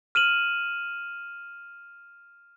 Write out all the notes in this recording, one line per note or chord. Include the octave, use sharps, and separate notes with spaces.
F6 D#7 E7 F#7